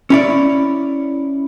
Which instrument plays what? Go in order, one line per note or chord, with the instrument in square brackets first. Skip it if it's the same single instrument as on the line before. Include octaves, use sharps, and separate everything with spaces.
[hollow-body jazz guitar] C#4 E4 D5